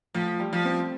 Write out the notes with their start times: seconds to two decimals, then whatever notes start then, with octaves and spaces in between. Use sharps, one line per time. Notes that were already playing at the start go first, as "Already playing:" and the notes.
0.14 A2 F3
0.40 G3
0.53 F3
0.65 C4